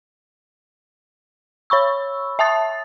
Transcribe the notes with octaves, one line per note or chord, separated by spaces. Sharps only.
C#5 B5 C#6 E6
E5 A5 D#6 A6